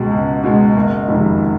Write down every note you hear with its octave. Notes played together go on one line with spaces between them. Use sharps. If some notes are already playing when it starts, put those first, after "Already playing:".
Already playing: C#2 B2 G#3
C#2
B2 G#3
F#1
F2 C3 D#3 G#3